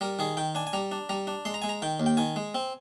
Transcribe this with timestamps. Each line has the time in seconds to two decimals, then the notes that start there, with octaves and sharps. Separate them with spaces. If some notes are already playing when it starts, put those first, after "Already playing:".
0.01 G3 A#4
0.19 D#3 G#4
0.37 D#3 G5
0.55 D4 G#5
0.67 G#5
0.73 G3 A#5
0.92 D4
1.09 G3 A#5
1.27 D4
1.45 G#3 C6
1.54 A#5
1.62 G#3 G#5
1.69 A#5
1.82 D#3 G5
2.00 D#2
2.06 G5
2.17 D#3 G#5
2.36 G#3
2.55 C4